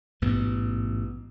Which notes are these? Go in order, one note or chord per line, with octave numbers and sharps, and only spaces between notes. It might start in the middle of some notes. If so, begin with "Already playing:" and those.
A1 G#2 B2 B3